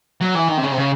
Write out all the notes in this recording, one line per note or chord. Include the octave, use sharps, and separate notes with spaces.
F#3
E3
D#3
C3
C#3
C3
C#3